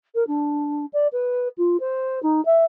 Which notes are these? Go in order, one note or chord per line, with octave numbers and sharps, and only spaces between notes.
A#4
D4
D5
B4
F4
C5
D#4
E5